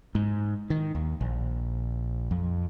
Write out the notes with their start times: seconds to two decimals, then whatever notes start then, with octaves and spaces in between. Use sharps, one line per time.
0.15 G#2
0.70 D#3
0.95 D#2
1.21 A#1
2.31 F2